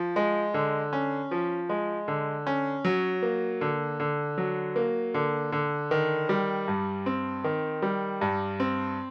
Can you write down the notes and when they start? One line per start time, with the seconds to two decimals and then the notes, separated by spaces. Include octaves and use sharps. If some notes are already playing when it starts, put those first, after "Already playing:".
Already playing: F3
0.16 G#3
0.54 D3
0.93 C#4
1.31 F3
1.69 G#3
2.08 D3
2.47 C#4
2.85 F#3
3.22 A#3
3.61 D3
4.00 D3
4.38 F#3
4.76 A#3
5.14 D3
5.52 D3
5.91 D#3
6.29 G3
6.68 G2
7.06 C4
7.44 D#3
7.82 G3
8.21 G2
8.60 C4